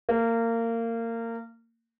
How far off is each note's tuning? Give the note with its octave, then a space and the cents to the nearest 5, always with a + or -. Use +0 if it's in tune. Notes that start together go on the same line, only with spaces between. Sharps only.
A#3 -25